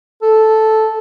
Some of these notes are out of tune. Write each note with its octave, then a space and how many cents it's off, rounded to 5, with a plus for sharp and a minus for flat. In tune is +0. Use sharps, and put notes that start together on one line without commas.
A4 -5